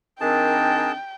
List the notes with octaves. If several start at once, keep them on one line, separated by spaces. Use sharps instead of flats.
D#3 C4 D4 G#4 A#4 G5 A5